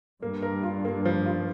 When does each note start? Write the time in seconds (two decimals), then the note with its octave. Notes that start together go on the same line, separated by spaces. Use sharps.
0.22 G2 A#3
0.42 A#4
0.63 F4
0.85 A#3
1.05 F3
1.26 F4